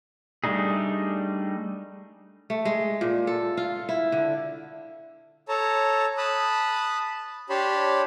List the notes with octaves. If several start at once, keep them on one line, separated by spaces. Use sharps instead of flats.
G3 A3 D4 D#4 G#4
A3
G#3
A#2
A4
F4
E4
D3
A4 C#5 A5 A#5
A5 B5 D#6 F#6
D4 G4 C#5 A5 B5 C6